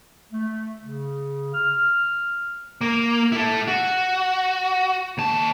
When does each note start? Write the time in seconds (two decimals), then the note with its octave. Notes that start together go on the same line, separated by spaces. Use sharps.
0.32 A3
0.82 C#3
1.54 F6
2.81 A#3
3.32 E4 A4
3.68 F#4
5.18 D#2 A5